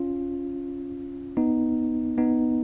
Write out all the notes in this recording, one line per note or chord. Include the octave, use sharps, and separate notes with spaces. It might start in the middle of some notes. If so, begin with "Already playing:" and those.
Already playing: C#4 F4
B3 D#4
B3 D#4